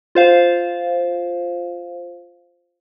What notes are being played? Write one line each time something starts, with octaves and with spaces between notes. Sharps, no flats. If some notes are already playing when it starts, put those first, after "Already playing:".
F4 C5 F5